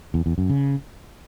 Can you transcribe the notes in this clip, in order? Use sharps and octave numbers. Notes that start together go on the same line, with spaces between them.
E2
E2
F#2
C#3